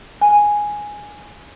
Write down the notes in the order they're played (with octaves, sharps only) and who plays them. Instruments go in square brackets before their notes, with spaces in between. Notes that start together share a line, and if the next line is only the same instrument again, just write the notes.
[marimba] G#5